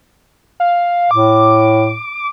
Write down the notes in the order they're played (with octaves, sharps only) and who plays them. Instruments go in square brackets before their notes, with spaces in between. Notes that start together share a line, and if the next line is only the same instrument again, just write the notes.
[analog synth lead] F5
[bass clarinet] A2 [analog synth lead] D6